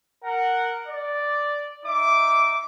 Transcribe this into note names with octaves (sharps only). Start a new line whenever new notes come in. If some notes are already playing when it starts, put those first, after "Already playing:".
A#4 F#5
D5
D#4 E5 D6